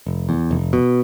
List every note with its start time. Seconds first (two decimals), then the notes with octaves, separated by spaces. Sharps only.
0.07 F1
0.29 E2
0.51 F1
0.73 B2